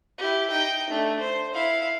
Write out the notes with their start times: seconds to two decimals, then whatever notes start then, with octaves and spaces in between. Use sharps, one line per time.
0.18 E4 G4
0.50 D#4 G5
0.89 A3 D4
1.19 C5
1.54 E4 F5